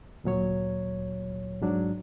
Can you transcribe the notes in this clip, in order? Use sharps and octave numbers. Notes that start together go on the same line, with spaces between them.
D2 A#2 F#3 C#5
G#2 F#3 D4